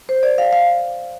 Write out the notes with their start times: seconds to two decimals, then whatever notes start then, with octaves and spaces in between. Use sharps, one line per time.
0.09 C5
0.23 D5
0.38 F5
0.53 F5